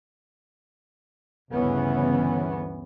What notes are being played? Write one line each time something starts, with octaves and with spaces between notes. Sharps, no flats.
G1 D2 C#3 E3 B3 C#4